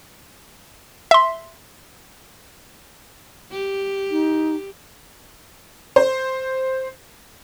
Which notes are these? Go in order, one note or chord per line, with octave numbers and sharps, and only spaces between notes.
E5 C6
G4
D#4
C5